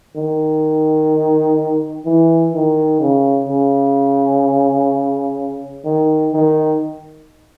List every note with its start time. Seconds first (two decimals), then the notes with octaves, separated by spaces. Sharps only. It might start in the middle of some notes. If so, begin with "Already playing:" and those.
0.16 D#3
2.06 E3
2.54 D#3
3.00 C#3
3.49 C#3
5.85 D#3
6.33 D#3